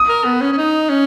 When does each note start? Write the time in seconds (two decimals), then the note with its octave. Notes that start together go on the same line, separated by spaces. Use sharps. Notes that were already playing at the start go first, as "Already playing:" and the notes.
Already playing: D#6
0.09 A#4
0.24 B3
0.41 C#4
0.52 C#4
0.58 D#4
0.89 C#4